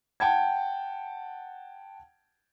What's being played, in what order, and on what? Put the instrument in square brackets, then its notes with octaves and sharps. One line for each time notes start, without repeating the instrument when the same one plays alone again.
[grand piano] F#5 G5 A5 G#6